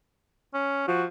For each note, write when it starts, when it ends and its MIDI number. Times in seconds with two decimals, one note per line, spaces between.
0.54 0.83 61
0.88 1.06 53
0.88 1.03 66